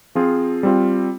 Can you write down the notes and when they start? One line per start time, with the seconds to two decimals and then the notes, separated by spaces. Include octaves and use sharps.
0.15 F3 C4 F4 G#4
0.63 G3 C4 F4